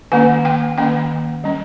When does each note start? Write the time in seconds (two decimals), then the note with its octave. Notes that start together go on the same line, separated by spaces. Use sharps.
0.12 D#3 A#3 C#4 G#5
0.45 G5
0.78 D#3 A#3 C#4 G5
1.44 G3 C#4